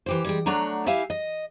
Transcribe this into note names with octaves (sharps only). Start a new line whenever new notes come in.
E3 G4 C5
G3 G#3 G5
F#3 A3 D4 F#5 A#5
E4 G4 E5 F5 G#5
D#5